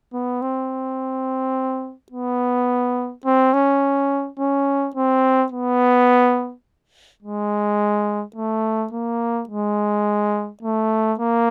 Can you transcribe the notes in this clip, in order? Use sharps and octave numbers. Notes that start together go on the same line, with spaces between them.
B3
C4
B3
C4
C#4
C#4
C4
B3
G#3
A3
A#3
G#3
A3
A#3